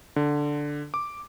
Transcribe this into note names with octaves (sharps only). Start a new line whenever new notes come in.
D3
D6